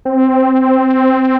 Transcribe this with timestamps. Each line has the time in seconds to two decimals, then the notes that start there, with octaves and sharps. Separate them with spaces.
0.05 C4